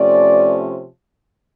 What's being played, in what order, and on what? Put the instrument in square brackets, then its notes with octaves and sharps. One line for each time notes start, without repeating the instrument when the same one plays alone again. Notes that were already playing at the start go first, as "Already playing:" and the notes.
Already playing: [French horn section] C3 F3 A3 C#4 D5